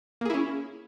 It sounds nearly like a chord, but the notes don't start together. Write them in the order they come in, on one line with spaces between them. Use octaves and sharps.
A#3 G#4 E4 C#4